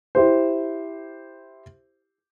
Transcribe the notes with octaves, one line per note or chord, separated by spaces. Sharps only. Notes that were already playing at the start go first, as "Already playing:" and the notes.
E4 G4 C5